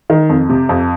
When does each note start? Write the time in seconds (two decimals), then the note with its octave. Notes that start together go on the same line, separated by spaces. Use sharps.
0.10 D#3
0.29 F2
0.49 C3
0.69 F2